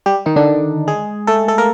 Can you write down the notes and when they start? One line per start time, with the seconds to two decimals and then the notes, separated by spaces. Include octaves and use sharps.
0.06 G3 G4
0.26 D#3 D#4
0.36 D3 D4
0.88 G#3 G#4
1.27 A3 A4
1.48 A3 A4
1.58 A#3 A#4